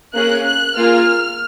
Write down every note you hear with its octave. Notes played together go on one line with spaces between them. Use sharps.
A#3 C#4 G#4 F#6
F#6
A#3 F4 G#4 F6